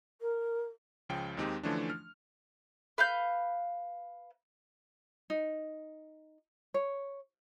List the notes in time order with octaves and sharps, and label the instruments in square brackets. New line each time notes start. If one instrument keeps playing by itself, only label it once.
[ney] A#4
[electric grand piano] C#2 C#3 F3 G5
D#2 G#3 C4 D#4 G4
D3 E3 F3 A3 C#4 D4
F6
[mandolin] B4 F5 G6
[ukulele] D#4
C#5